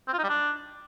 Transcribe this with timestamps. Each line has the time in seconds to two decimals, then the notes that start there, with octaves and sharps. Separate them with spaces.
0.08 C4
0.13 F4
0.18 D#4
0.24 G3
0.29 D4